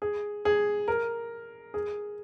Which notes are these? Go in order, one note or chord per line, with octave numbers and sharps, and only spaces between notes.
G#4
G#4
A#4
G#4